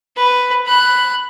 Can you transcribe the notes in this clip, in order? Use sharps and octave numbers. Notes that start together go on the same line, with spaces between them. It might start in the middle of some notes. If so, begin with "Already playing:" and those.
B4
B5 F#6